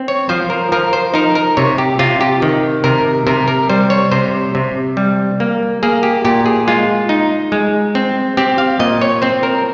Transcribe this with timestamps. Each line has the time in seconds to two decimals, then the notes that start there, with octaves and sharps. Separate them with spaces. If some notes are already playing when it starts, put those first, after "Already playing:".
Already playing: C4
0.08 C#5
0.29 F3 C5
0.50 A#4
0.72 F3 A#4
0.93 C5
1.14 D#4 A#4
1.35 A#4
1.57 C3 C#5
1.78 G4
1.99 C3 F4
2.21 G4
2.42 D#3
2.84 C3 A#4
3.27 C3 A#4
3.48 A#4
3.70 G3 C5
3.90 C#5
4.12 C3 C5
4.55 C3
4.97 G3
5.40 A#3
5.83 A#3 G#4
6.03 G4
6.25 A#2 G4
6.46 G#4
6.68 G#3 F4
7.09 D#4
7.52 G#3
7.95 C4
8.37 C4 G4
8.58 F5
8.79 A#2 D#5
9.02 C#5
9.22 C4 C5
9.43 A#4